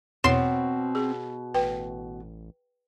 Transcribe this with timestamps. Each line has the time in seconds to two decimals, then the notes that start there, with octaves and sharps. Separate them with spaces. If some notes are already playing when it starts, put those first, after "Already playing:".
0.24 E2 B2 C4 C#5 C6 E7
0.95 G#4
1.54 A1 B4 G5